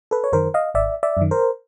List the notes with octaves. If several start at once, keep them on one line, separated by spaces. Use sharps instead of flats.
A4 B4
C#5
F#2 D#3 A#4 C5
D#5 F5
G#1 D5 E5
D5 E5
F#2 D#3
A#4 C5